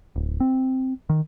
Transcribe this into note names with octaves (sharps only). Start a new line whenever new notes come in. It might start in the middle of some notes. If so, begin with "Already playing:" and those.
D1
C4
D#3